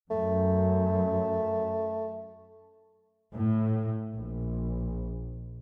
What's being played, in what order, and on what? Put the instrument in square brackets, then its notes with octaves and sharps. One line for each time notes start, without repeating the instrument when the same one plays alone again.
[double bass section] F#2 [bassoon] A3
[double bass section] A2
A#1